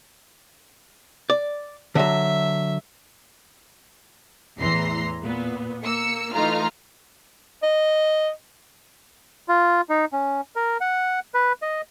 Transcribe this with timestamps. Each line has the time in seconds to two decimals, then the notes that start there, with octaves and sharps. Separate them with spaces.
1.30 D5
1.95 D3 F#3 E5
4.58 E2 A2 E3 A#5 C6 C7
5.23 A#2 B3
5.84 A#3 E6 C#7
6.33 E3 A3 D#4 F4 A#5 F6
7.63 D#5
9.48 F4
9.89 D#4
10.13 C#4
10.56 A#4
10.81 F#5
11.34 B4
11.62 D#5